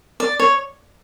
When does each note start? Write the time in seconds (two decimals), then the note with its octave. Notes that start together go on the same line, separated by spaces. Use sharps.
0.20 D5
0.39 C#5